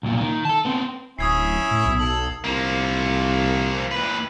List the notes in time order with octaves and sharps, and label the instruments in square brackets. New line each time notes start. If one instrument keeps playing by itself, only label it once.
[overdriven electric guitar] C2 A#2
D#3
A4 A5
B3 C4
[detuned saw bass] D1 [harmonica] C#4 E4 [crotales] D#6 G#6 C7
[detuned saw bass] A2
B1
[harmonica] A4 [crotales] F#7
[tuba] C2 [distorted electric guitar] F3 A#3
[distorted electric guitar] D#2 B4